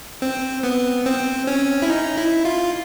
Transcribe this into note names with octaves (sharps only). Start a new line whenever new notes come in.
C4
B3
C4
C#4
E4
D#4
E4
F4